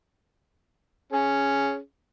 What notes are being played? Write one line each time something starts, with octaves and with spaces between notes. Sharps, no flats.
C#4 G#4